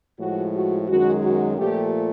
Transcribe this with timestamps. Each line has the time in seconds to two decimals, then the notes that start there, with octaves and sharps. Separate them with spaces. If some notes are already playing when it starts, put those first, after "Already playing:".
0.19 A2 F3 G#3 F#4
0.53 F#4
0.88 F#2 D#3 G#3 F#4
1.23 F#4
1.57 A#2 F3 A3 G4